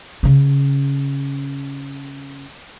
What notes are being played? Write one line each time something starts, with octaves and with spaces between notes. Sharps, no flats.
C#3 C#4